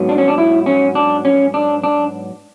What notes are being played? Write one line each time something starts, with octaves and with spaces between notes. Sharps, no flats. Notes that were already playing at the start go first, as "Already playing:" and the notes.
Already playing: G#2 F#3 B3
D4
C#4
D4
E4
C#4
D4
C#4
D4
D4